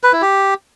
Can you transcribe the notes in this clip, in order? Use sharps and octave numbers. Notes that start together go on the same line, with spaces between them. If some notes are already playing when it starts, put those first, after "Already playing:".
B4
E4
G4